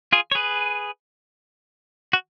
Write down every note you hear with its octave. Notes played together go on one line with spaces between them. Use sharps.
F4 G#4
C#5
G#4 B4
F#4